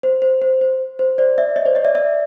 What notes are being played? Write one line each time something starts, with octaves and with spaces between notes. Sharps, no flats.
C5
C5
C5
C5
C5
C5 D5
D5 E5
C#5 D#5
C5 D5
C#5 D#5
D5 E5
D5 E5